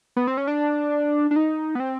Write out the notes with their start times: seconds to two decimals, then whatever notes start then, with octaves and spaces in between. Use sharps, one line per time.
0.16 B3
0.27 C4
0.37 C#4
0.47 D4
1.31 D4
1.36 D#4
1.75 B3
1.80 C4